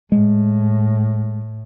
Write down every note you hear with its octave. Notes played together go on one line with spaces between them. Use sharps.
A2 G#3